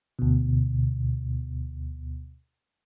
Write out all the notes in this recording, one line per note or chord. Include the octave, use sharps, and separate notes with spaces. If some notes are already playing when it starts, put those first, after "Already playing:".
D2 B2